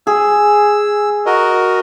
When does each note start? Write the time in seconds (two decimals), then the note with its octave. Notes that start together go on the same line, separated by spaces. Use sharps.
0.07 G#4 E6
1.26 F#4 A#4 D#5